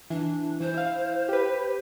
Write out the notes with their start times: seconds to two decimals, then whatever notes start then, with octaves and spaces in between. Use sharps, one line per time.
0.10 E3 D4
0.60 E3 C5
0.74 E4 F5
1.29 G4 B4